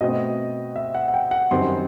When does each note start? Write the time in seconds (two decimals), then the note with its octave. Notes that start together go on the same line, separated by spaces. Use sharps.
0.01 B2 A3 C4 D#5
0.76 E5
0.95 F#5
1.08 F#5
1.14 G5
1.31 F#5
1.51 F#2 D#3 G3 C4 C6